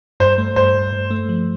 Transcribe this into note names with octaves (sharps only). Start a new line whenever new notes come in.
G2 C5
A3
G2 C5
G2
G2
A3
F3